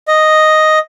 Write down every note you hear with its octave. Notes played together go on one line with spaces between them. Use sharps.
D#5